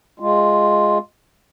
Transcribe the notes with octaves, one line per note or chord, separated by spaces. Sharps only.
G#3 F4